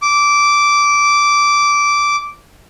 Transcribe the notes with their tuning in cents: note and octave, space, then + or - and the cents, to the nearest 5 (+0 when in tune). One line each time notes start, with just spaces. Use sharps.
D6 -10